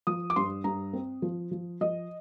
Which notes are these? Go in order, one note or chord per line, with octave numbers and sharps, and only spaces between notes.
F3 D#6
D6
G2 C6
G2 A#5
C4
F3
F3
F3 D#5